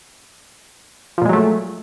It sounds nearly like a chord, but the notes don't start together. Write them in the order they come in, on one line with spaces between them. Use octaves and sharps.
F3 A#2 G#3 F#3 A3